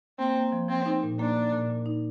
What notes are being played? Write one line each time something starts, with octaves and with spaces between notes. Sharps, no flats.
A#3 C4
A#3
F3
F3 C4
D#4
A#2
A#3 D4
A#3
A#2
A#2
D#4